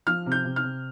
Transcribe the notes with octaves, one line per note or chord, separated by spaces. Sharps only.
F3 F6
C3
G6
C3
F6
C3